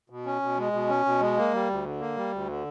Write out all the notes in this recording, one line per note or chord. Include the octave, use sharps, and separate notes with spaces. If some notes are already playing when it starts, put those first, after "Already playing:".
B2
C#4
B2
G#3
B2
C#4
B2
G#3
A#3
G3
D2
D3
A#3
G3
D2
D3